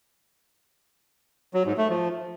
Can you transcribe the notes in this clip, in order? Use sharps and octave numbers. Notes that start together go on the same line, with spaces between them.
F#3
G#2
A3
F3